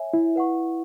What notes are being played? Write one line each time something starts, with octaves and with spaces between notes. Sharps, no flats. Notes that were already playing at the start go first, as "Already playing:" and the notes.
Already playing: C#5 E5 G#5
E4
B4 F#5 C#6